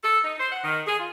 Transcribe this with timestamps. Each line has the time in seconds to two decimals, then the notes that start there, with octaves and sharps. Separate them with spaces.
0.04 A4
0.24 D#4
0.39 C5
0.52 F#5
0.64 D#3
0.87 G#4
0.99 F4